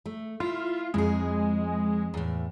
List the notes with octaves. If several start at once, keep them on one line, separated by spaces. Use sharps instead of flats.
A3
E4 F4
F2 G#3 G#4
E2 A2